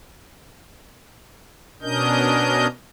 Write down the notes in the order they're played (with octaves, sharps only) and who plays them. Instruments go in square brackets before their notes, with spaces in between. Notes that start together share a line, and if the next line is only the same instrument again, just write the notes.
[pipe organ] B2 C#4 D4 A#4 D#5 G6